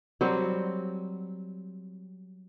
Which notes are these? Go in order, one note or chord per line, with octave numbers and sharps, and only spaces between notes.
F#3 G3 C4